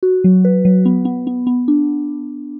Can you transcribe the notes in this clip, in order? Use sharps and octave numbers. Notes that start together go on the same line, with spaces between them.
F#4
F#3
B4
F#3
B3
B3
B3
B3
D4